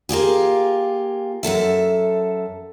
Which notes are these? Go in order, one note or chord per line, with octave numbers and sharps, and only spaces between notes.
A#3 F4 G4 G#4
F#2 C3 A4 E5